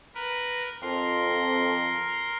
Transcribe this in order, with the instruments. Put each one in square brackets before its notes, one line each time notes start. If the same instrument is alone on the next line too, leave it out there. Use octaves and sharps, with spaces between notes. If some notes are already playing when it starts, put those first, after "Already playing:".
[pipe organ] A#4 B4
[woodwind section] F2 [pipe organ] A#4 C6